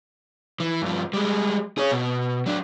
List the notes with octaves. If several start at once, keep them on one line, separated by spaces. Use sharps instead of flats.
E3
G2 F3
G3 G#3
G#4 C#5
B2
F#3 D4